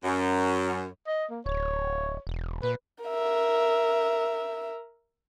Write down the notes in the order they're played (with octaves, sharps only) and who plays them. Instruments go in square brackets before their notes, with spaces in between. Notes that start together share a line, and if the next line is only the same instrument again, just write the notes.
[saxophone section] F#2
[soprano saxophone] D#5
A#3
[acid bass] D1 [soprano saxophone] C#5
[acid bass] E1
[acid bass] A#2 [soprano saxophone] B4
[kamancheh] A#4 E5